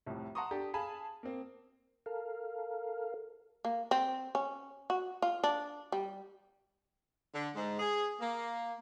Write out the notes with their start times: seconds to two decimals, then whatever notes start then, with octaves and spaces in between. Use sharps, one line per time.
0.06 C2 F2 A2
0.35 F#5 A5 A#5 C6 C#6 D#6
0.51 D4 G4 A4
0.74 G#4 F5 G#5 A5 B5
1.23 A#3 C4
2.06 A4 A#4 F5
3.65 A#3
3.91 C4
4.35 C#4
4.90 F#4
5.22 F4
5.44 D4
5.92 G3
7.34 D3
7.56 G#2
7.80 G#4
8.21 A#3